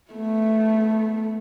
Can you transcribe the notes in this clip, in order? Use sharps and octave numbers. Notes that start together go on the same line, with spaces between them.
A3 B3